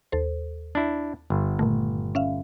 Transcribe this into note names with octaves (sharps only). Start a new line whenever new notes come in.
D#2 A4 C5
D4 E4
G1
A#2 D#3 A3
C#4 E5 F5